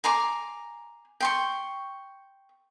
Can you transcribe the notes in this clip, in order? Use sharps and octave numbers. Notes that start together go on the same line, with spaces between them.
G#5 A#5 C6 D6
G5 C6 C#6